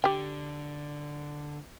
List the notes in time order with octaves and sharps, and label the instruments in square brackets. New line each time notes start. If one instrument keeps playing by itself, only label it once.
[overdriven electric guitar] D3 [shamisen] G4 G5